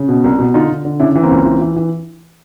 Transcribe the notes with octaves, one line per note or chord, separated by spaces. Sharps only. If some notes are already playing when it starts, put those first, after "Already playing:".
Already playing: C#3
B2
C2
B2
D3 D#4 F4
D3
D3
C#3 D4 E4
E3
A#3 C4
C#2
E3
E3
E3